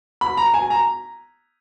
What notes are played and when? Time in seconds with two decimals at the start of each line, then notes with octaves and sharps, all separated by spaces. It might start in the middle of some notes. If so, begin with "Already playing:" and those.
0.21 B5
0.37 A#5
0.54 G#5
0.70 A#5